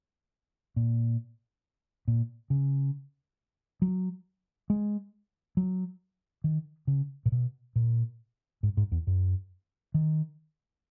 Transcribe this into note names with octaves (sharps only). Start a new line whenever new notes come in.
A#2
A#2
C#3
F#3
G#3
F#3
D#3
C#3
A#2
B2
A#2
G#2
G#2
E2
F#2
D#3